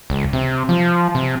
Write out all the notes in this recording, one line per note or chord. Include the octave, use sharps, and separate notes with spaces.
C#2
C3
F3
C3